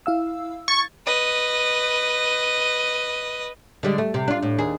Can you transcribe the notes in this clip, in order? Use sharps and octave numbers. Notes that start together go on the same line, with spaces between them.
E4 F5 E6
C#6 G#6 A6
B4 D#5
D3 G3 G#3
A3
C3
D4 F4
A2
D#2 G#4